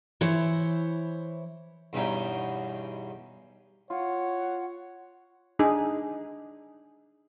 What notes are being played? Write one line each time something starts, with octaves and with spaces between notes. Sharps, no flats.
E3 E4 C5 C#5
E2 G2 B2 C#4 D#4 G5
F4 C#5 F#5
D4 D#4 G#4